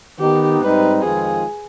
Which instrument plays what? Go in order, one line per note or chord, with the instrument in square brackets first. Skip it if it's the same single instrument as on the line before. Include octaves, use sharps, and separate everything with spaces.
[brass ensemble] D#3 B3 D#4 [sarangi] G4
[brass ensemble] G#2 G3 C4 D#4 [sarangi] B4
[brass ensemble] F2 D#3 G#3 C4 F4 [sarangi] G#4